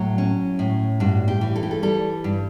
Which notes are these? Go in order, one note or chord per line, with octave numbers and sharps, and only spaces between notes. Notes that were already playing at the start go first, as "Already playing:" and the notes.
Already playing: A2 F#3
C#4
A2
G2 F#4
G4
E3
A4
G4
A4
G3 A4
G2